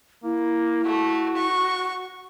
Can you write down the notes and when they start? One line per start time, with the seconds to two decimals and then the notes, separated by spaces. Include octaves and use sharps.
0.24 A#3 E4
0.84 A3 F#4
1.37 C#6